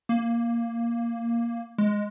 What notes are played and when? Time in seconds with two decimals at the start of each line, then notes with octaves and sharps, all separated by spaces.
0.09 A#3
1.78 G#3